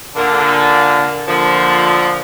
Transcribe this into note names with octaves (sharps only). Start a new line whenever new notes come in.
A#2 D3 A#3
A#2 D3 F3